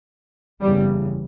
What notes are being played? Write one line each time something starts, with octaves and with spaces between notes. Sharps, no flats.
F#1 E2 C#3 G3